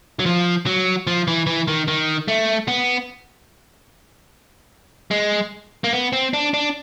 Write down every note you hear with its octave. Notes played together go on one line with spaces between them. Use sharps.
F#3
F3
F#3
F3
E3
E3
D#3
D#3
A3
B3
G#3
A#3
B3
C4
D4
D4